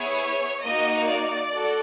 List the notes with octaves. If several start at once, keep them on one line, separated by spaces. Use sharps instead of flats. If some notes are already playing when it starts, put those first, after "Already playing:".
Already playing: B3 E4 G#4 C#5
A#3 D#4 F#4 D#5
D5
F#4 A4